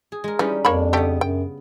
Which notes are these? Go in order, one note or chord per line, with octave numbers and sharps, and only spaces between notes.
G#4
G#3 A#4
E3 G3 C#4 D#4
F2 A#3 D4 C#5 B5
C#3 A3 B3 G4 G5
F#2 G5